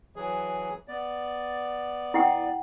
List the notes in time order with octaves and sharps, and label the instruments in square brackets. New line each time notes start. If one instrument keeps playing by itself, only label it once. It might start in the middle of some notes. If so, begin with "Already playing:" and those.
[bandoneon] E3 F#3 G#4
B3 D5
[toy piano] E4 F#5 G5